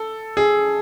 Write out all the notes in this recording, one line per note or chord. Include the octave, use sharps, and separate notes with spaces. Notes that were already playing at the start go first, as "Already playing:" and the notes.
Already playing: A4
G#4